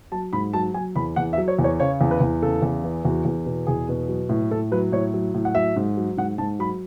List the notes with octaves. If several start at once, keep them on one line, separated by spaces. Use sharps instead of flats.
F#3 A5
G#2 B5
F#3 A5
F#3 G#5
E2 B5
E2 F#5
E5
F#3
C#5
E2
C#5
C#3 C#5
E2
B4
E2
C#3 A4
E2
E3
E2 F#4
E2
B2
E2 G#4
B2
F#3
A2
A2 A4
F#3 B4
A2 C#5
F#3
A2
F#5
F#3 E5
G#2
F#3
G#2 F#5
G#2 A5
F#3 B5